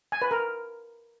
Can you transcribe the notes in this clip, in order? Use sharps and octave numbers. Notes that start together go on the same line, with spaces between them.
G#5
B4
A#4